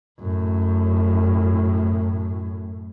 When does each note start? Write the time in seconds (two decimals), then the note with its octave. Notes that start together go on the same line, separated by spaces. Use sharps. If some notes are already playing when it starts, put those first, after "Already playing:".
0.20 F#2 A2